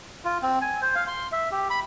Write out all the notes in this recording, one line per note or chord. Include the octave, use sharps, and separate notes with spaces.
F4
C4
G#5
C5
F5
C6
E5
G4
B5